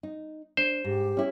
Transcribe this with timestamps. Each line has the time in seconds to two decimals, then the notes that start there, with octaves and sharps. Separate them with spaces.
0.03 D#4
0.57 D4 C5
0.84 G#2 G4
1.17 C#4 E4